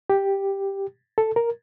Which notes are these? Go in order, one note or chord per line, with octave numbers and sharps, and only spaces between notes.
G4
A4
A#4